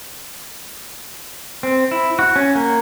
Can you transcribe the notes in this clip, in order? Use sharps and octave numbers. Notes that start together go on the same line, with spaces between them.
C4
E4
F#4
C#4
A#3